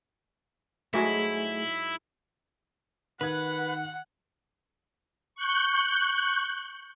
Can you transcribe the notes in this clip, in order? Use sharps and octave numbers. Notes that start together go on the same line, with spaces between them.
G#2 F#3 G#3 A3 E4 G#4
D#3 B4 F#5 G#6
C#6 F#6 G6